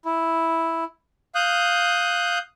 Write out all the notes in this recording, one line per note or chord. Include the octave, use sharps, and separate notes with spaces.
E4
F5 D#6 F#6 G6